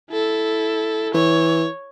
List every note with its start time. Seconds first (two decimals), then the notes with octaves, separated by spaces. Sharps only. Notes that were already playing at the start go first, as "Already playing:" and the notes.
0.11 E4 A4
1.15 E3 C#5